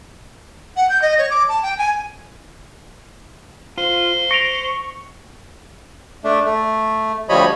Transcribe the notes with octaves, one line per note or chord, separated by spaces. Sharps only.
F#5
G6
D#5
C#5
D6
A5
G5
G#5
F4 C5
C#6 A#6 D7 F7
A3 D4
A3
D2 F3 G3 C#5 D#5 B5